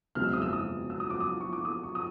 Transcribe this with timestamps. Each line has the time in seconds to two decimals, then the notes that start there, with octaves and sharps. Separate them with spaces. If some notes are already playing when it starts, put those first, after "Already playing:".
0.15 F#1 E2 B2 G#3 C4 F6
0.24 E6
0.33 D#6
0.42 E6
0.53 D#6
0.90 E6
1.00 D#6
1.10 D6
1.20 D#6
1.41 C#6
1.53 D6
1.65 D#6
1.83 C#6
1.95 D#6